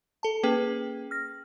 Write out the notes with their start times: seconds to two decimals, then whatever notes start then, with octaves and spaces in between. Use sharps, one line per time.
0.23 A4 A5
0.43 A#3 C#4 G#4 B4 G5
1.11 F6 A#6